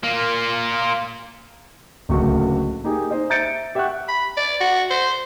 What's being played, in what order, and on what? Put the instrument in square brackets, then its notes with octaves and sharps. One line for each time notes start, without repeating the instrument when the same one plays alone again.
[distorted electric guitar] A#3 F4
[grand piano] D1 C#2 A3 A#3 F#4 C#6
A#3 D#4 G4 G#4
D#4 C5 D#5
E5 A#5 G6 A6 C#7 D7
G4 E5 F#5 G5 C#6 F#6
[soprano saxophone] B5
D5
F#4
C5